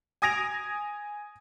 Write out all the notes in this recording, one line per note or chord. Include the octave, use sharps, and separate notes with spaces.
G#5 D#6 G#6 A#6 D7 F7